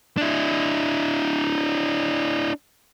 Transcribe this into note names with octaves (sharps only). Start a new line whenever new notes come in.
D4 E4